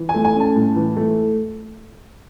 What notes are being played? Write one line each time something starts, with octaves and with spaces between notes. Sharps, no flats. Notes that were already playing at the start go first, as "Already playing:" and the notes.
Already playing: E3
G#5
A3
G#5
C#4
A5
A2
E3
A3